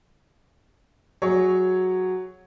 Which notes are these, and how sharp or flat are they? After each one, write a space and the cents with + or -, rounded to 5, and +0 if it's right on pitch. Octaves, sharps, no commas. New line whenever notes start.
F#3 +0 G#4 -10 C#5 +0